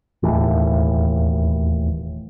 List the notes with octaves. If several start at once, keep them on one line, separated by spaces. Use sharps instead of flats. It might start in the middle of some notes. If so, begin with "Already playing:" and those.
E1 D#2 A2 E3